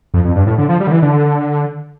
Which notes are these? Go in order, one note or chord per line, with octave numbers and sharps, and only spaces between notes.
F2
F2
G2
A2
D3
F3
G3
D3
E3
D3